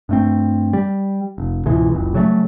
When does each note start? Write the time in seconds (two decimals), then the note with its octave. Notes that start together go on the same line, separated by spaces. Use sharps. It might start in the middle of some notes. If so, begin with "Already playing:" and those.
0.09 G2 A3 C4
0.73 G3
1.38 F1
1.66 C#2 G#2 B2 E3
1.91 F#1 C#2
2.14 C#3 F#3 G3 A3